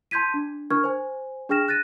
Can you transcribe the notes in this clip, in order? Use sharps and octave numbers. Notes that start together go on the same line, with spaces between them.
A5 C6 G6 G#6 B6 D#7
D4
D4 A#4 C#6 F6 G#6
C5 G#5
D4 G#4 G5 F6 A#6 E7
F#6 A6 A#6 D#7